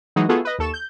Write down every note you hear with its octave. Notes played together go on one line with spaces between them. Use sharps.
E3 F#3 G#3 D#4 F#4
A3 B3 F4 F#4 G#4 A4
B4 D#5
D#2 A4 C#6 E7
G6